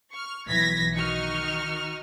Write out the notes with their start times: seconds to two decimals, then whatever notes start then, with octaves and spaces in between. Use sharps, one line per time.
0.12 C#6 F6
0.46 B1 E3 G#6 A#6 B6
0.94 D#3 D#4 F#4 D#5 C#6 F6